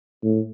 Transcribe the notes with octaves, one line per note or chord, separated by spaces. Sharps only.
A2